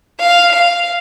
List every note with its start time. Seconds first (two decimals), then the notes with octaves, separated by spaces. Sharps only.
0.20 F5
0.52 F5